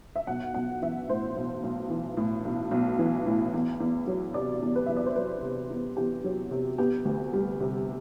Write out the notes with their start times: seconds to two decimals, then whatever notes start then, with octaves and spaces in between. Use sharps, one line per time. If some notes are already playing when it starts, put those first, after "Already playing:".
0.16 E5
0.27 B1 F#5
0.54 B1 F#5
0.82 E3 E5
1.09 A2 C5
1.37 B1
1.63 B1
1.90 E3
2.17 A2
2.45 B1
2.71 B1
2.99 E3
3.26 A2
3.54 E2
3.80 E2
4.07 F#3
4.34 C3 D5
4.62 E2
4.75 B4
4.86 E2 E5
4.97 D5
5.06 C5
5.15 F#3 B4
5.42 C3
5.70 E2
5.97 E2 G4
6.24 F#3
6.51 C3
6.78 B3 G4
7.05 D2
7.33 G3
7.61 C3